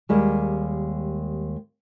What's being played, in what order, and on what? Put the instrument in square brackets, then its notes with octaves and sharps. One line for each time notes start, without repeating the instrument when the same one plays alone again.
[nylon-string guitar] D#2 G3 G#3